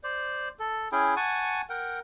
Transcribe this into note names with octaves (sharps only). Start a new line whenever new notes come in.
C5 D5
A4
C#4 E4 G#4 G5
F#5 G#5 A5 C#6
A#4 F#5 G5